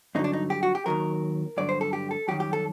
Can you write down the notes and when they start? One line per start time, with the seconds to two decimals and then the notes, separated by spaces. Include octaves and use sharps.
0.15 G2 D3 F#3 D#4
0.24 D4
0.33 D#4
0.50 G4
0.63 F#4
0.75 G4
0.86 D#2 D#3 F#3 A#4
1.57 G2 D3 F#3 D5
1.69 C5
1.81 A4
1.93 G4
2.11 A4
2.28 F#2 D#3 G3 G4
2.40 G4
2.53 A4